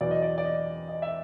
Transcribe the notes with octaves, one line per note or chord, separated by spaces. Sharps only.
E2 B2 F#3 D5
D#5
D5
D5
D#5
D#5
E5